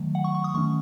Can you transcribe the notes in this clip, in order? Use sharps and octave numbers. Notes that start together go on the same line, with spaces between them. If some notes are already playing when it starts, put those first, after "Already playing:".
Already playing: D#3 F#3 A3
F#5
C#6
C#6
D#6
D#3 A3 C#4 C#6